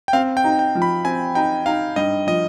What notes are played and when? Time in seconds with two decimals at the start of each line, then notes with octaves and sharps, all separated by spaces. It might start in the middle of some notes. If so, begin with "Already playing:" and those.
0.08 G5
0.13 C4 F5
0.37 G5
0.44 D#4
0.59 G5
0.75 F3
0.82 B5
1.05 C4 G#5
1.35 D#4 G5
1.66 D#4 F5
1.96 G2 D#5
2.27 F3 D#5